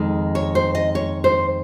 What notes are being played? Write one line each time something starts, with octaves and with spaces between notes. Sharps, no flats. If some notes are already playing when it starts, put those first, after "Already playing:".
Already playing: F2 D#3 G#3
C#5
C5
D#5
C#5
C5